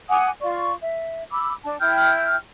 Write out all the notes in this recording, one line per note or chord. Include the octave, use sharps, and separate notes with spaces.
F#5 G#5 D6 D#6
F4 D5 C#6
E5
B5 D6 E6
D4 A5
E4 G5 F6 G6